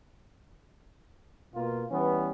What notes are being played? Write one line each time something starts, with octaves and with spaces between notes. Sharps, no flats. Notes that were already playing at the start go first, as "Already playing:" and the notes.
B2 A#3 F4
E3 G3 B3 C#4